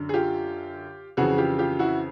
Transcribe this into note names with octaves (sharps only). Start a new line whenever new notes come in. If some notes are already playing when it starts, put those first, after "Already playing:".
Already playing: F#2 D3
G#4
F4 G4
F2 C#3 E3 F#4 G#4
F4 G4
F4 G4
E4 F#4